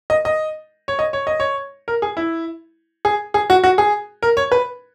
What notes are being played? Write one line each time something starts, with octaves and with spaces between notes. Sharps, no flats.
D#5
D#5
C#5
D#5
C#5
D#5
C#5
A#4
G#4
E4
G#4
G#4
F#4
F#4
G#4
A#4
C#5
B4